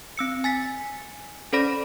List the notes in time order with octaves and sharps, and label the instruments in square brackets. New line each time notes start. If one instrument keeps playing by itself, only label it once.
[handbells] C4 E6 C#7
G#5 A6 B6
C#4 A4 C5 D5 B5 A#6